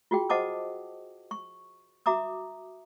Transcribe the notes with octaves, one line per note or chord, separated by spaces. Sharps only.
F4 F#4 G#4 G5
C5 D#5 F#5 A5 D6 D#6
C#6
F#4 E5 A#5 D6 D#6